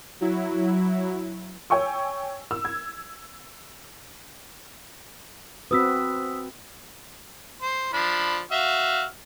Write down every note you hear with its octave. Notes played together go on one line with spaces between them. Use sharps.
F#3 E4
C#5 G5 G#5 C#6 E6
E6
G#6
C4 F#4 B4 D#6 E6 B6
C5
F3 D4 B5
F#4 E5 F5